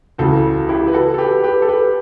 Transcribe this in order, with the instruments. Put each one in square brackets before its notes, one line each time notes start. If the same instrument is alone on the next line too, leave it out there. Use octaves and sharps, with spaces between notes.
[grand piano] C#2 C#3 E3 F#4 A4
E4 G4
B4
F#4 A4
A4
G4 B4
G4 B4
A4
G4 B4